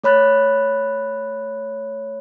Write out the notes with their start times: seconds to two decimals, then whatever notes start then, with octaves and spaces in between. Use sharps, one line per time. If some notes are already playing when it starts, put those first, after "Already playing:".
0.04 A3 C#5 B5 F#6 A6